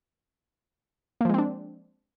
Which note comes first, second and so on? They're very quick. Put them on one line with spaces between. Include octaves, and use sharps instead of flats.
A#3 F3 G#3 C4 D4